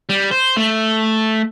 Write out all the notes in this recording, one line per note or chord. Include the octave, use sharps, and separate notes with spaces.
G3
C5
A3